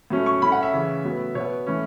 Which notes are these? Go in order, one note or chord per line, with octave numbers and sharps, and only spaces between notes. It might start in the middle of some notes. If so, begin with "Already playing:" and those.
A2 F#3 A3 C#4
C#6
A2 A3 C#4 B5
F#5
E5
C#3 E3 C#4
A2 F#3 B3
B2 B3 C#5
A2 E3 C#4